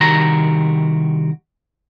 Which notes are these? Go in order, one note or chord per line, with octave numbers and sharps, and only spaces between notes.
C2 D#3 F#4 G4 A#5